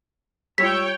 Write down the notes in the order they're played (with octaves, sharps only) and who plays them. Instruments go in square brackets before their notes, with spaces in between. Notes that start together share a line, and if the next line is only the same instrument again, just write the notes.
[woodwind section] C#2 E6 [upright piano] G3 F4 [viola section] C#5 G5 [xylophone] B6